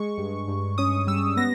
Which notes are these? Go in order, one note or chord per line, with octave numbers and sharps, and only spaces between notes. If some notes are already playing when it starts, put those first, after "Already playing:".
Already playing: G#3 C#6
G2
G2
C#4 D#6
G3 E6
B3 A#6